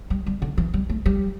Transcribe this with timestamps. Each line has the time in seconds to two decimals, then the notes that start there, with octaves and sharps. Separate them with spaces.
0.10 G3
0.26 G3
0.42 D3
0.58 E3
0.74 G3
0.89 A3
1.06 G3